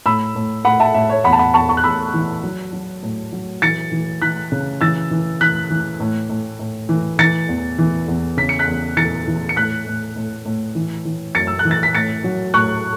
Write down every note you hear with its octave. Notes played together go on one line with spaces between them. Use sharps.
A2 B5 E6
A2
A2 F#5 B5
E5 A5
A2 E5
C#5
E2 F#5 B5
A5
F#5 B5
E2 A5 C#6
A5 C#6
F#6
E2 B5 E6
E3
F#3
F#3
A2
F#3
E3 A6 C#7
E3
E3 F#6 B6
C#3
E3 E6 A6
E3
E3 F#6 B6
E3
A2
A2
A2
E3
E3 A6 C#7
E2
E3
E2
C#3 B6
C#7
F#6 B6
E2
E3 A6 C#7
E3
C#7
A2 F#6 B6
A2
A2
A2
E3
E3
F#2 A6 C#7
E6
F#6
E3
A6
B6
A2 A6 C#7
F#3
A2 C#6 F#6